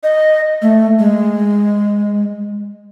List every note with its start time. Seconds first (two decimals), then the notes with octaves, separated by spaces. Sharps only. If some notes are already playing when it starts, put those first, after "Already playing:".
0.04 D#5
0.62 A3
0.99 G#3